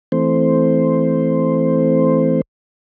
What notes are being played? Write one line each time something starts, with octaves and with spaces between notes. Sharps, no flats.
E3 A3 C4 C5